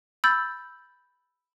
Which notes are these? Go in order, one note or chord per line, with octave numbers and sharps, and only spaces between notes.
B5 E6 G6 A6